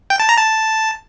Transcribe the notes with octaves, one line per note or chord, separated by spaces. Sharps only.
G5
A5
A#5
A5